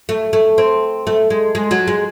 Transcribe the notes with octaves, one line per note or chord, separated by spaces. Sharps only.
A3
A3
C4
A3
G#3
G#3
F#3
G#3